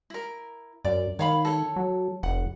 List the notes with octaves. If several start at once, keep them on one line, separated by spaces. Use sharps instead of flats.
E4 A#4
F#2 D5
D#3 C#5 F5 B5
A4 C#5
F#3
F1 F#5